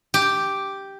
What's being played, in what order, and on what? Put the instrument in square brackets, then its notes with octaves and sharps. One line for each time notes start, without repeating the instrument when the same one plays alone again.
[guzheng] G4